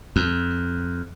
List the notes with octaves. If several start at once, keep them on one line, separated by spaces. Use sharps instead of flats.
F2